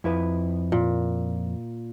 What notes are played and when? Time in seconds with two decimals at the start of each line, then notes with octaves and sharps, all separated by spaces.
0.04 F2 E4 B4
0.72 A#2